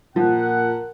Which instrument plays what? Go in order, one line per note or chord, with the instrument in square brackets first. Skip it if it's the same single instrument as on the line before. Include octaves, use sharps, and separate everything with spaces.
[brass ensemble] A#2 A#4 F#5 [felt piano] F3